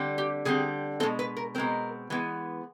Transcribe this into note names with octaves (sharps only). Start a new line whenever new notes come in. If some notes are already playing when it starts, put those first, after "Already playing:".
Already playing: D3 G3 C4
G4
D3 G3 C4 G#4
B2 G#3 C4 A4
B4
A#4
B2 G#3 C4 A#4
E3 G#3 B3